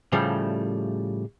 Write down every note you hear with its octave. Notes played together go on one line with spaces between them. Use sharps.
A2 C#3 F3 G3 A3